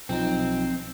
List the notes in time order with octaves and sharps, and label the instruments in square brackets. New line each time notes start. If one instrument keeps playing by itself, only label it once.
[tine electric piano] B1 F3 D#4 [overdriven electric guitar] C4